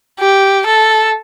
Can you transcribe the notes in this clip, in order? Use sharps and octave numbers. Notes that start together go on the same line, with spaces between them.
G4
A4